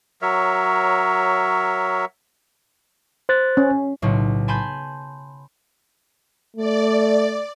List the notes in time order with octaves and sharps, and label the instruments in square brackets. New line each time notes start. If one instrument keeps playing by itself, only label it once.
[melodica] F#3 A#4 C#5 E5
[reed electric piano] C5 F#6 A6
[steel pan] C#4
[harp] B1 A2 C#3
G#5 A5 B5 C6 G6 D#7
[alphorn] A3 [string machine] D5